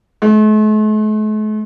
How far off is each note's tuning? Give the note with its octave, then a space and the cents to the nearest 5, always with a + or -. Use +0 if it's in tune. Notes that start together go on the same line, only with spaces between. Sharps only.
A3 -45